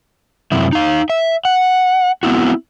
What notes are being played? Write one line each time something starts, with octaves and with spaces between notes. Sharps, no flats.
F#2 C3 E4
D#4 F5
E5
F#5
B3 C4 E4 F#4